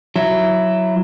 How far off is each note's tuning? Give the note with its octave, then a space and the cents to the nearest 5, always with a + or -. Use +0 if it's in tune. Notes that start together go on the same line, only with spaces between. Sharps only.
F#3 +0 E4 +0